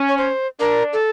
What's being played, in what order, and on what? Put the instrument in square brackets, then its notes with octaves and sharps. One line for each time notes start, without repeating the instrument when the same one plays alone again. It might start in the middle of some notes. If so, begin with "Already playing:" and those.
Already playing: [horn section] C#4
[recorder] C#5
C5
[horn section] D4 [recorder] A#4
[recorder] A4